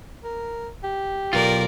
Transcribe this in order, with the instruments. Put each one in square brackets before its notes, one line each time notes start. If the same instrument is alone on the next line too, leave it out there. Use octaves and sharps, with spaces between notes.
[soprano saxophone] A#4
G4
[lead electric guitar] B1 F4 [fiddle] A#4 D5